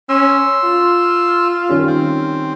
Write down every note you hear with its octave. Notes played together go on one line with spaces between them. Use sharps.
C#4 C6 E6
F4
D#3 G3 C#4
C4